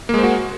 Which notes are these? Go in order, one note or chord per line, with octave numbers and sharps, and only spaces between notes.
G#3 A#3 F#4 C5